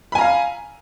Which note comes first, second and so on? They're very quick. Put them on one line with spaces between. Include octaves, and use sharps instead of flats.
B5 G#5 A#5 F5